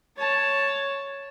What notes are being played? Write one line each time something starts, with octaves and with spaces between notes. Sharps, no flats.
C#5 A5